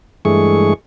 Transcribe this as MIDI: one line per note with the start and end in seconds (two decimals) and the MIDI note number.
0.25 0.73 43
0.25 0.73 52
0.25 0.73 56
0.25 0.73 57
0.25 0.73 68
0.25 0.73 85